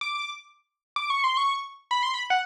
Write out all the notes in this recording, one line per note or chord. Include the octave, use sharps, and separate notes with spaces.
D6
D6
C#6
C6
C#6
B5
C6
B5
F#5